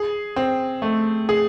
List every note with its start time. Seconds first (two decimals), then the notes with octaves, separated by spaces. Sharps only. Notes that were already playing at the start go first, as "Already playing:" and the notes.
Already playing: G#4
0.36 C4
0.82 A3
1.29 G#4